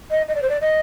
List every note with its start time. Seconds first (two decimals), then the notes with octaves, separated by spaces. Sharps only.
0.10 D#5
0.28 D#5
0.35 D5
0.42 C5
0.49 D5
0.61 D#5